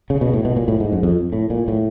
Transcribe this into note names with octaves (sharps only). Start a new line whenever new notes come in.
C#3
B2
A2
B2
A#2
A2
G#2
F#2
F2
A2
A#2
A2